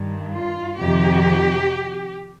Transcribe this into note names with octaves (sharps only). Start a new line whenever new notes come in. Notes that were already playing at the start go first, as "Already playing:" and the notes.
Already playing: G2 D#3
F4
F2 C3 D#3 G4